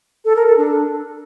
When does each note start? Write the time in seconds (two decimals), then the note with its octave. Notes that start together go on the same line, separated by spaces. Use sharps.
0.25 A4
0.36 A#4
0.46 A4
0.57 D4